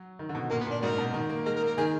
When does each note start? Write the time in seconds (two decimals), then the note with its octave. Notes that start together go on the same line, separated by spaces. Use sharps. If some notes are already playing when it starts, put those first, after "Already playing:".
Already playing: F#3
0.19 D#3
0.29 D3
0.35 B2
0.51 A#2 A#3
0.61 B3
0.67 A#2 D4
0.82 G#2 D4 F#4 A#4
0.98 B2
1.14 D#3
1.29 A#3
1.46 G#3 A#4
1.56 A#4
1.62 A#3
1.67 A#4
1.78 D#3 G#4